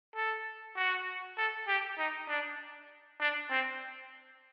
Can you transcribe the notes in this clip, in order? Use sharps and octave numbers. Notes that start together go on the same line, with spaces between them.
A4
F#4
A4
G4
D#4
D4
D4
C4